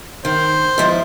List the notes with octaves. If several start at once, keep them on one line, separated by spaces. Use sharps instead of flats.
D#3 C5
G#2 F3 E4